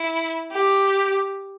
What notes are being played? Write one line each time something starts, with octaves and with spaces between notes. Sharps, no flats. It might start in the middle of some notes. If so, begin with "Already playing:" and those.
Already playing: E4
G4